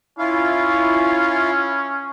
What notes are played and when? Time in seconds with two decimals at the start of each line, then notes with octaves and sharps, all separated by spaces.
0.19 C#4 E4 F4 F5